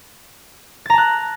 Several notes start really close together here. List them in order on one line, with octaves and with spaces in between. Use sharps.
A6 A#5 A5 F#6